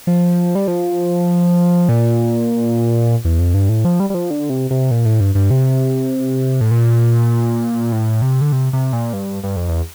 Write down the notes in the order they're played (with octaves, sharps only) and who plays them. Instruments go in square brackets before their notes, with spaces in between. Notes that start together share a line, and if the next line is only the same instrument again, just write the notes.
[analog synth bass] F3
G3
F3
A#2
E2
F2
G2
A2
F3
G3
G3
F3
D3
C3
C3
A#2
A2
G2
G2
C3
A2
A#2
A2
C3
D3
C3
C3
A#2
G2
G2
F2
E2